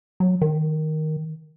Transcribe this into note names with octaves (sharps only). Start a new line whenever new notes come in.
F#3
D#3